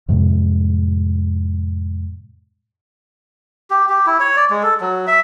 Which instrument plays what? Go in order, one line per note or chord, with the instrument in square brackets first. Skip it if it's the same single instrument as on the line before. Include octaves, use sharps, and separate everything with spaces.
[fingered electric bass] F2 A2 C3 G#3
[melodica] G4
G4
E4
C#5
D5
G#3
A4
F#3
E5